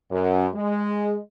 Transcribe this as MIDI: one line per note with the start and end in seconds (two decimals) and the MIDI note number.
0.11 0.45 42
0.54 1.18 56